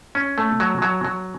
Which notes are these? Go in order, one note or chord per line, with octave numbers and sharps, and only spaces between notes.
C#4
A3
F#3
F#3
F#3